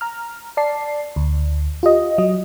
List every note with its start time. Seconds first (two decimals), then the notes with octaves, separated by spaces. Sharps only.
0.01 A#5 F6
0.57 D5 A5 C7
1.16 D2
1.83 F4 G4 D#5
2.18 F#3 D#5